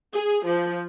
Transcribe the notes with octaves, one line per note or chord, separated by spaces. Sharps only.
G#4
F3